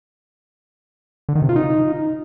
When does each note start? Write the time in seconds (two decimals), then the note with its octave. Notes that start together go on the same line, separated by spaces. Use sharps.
1.29 D3
1.35 D#3
1.42 C3
1.49 F4
1.56 D#4